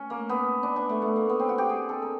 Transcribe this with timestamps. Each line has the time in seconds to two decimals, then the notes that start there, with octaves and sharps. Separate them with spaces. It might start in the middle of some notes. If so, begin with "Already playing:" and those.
Already playing: C#4
0.10 A#3
0.29 B3
0.63 D4
0.76 D4
0.89 A3
1.02 A3
1.16 A#3
1.29 B3
1.40 C4
1.49 F#4
1.58 G4
1.69 G#4
1.89 A4
2.02 A#4